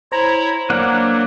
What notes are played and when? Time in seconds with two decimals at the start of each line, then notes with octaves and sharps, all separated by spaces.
0.12 E4 C5 C#5 A#5
0.70 F#3 A#3 D4 F#5